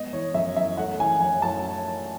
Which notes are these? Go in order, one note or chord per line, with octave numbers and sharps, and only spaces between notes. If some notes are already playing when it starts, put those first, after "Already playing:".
Already playing: G#3 B3 D#5
E3 C#5
F#2 E5
F#2 E5
A3 F#5
E3 G#5
F#2 G#5
F#2 A5